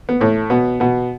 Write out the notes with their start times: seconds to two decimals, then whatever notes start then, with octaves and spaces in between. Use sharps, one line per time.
0.09 B3
0.21 A2 A3
0.50 B2 B3
0.80 B2 B3